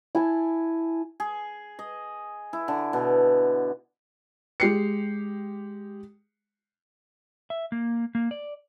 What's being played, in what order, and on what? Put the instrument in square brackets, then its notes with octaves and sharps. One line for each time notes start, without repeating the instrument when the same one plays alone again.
[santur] E4 G#5 A5
[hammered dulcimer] G#4
D#5
E4
D3
B2
[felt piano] G#3 G4 C7 C#7
[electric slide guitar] E5
A#3
A#3
D5